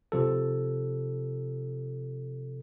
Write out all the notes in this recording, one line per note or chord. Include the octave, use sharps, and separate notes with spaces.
C3 F3 A4